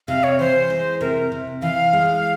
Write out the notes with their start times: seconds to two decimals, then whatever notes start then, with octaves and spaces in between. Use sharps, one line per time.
0.08 C3 F5
0.23 C#5
0.39 E3 C5
0.70 G#3
1.01 C3 A#4
1.32 C3
1.62 E3 F5
1.93 G#3